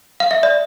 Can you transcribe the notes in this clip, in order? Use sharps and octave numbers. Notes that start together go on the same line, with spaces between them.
F5
E5
D5